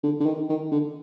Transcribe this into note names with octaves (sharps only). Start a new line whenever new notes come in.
D3
D3
D#3
D#3
D3